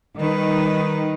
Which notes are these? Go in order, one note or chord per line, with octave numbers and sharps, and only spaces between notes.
D#3 G3 B4